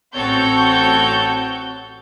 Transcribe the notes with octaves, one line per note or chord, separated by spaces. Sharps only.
A1 C4 F#4 A4 C#5 G6